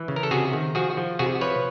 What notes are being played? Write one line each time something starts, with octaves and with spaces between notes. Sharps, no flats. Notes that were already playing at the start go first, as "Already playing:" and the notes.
Already playing: E3
C#3
A#4
A4
C3 F#4 G#4
D#3
F3 F#4 G#4
F3
C3 F#4 G#4
F3 B4 C#5